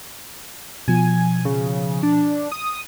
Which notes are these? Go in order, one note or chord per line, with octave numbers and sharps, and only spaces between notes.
B2 F3 G#5
C#3
D4
D#6